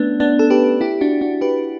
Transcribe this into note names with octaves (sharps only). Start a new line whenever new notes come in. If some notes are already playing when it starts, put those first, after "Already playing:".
Already playing: A3 B3 C#4 D4
B3 D4
A4
G4 B4
E4 G4
D4 F#4
D4 F#4
G4 B4